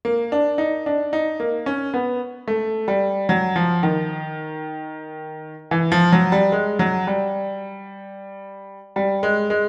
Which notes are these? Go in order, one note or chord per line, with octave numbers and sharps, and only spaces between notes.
A#3
D4
D#4
D4
D#4
A#3
C#4
B3
A3
G3
F#3
F3
D#3
E3
F3
F#3
G3
G#3
F#3
G3
G3
G#3
G#3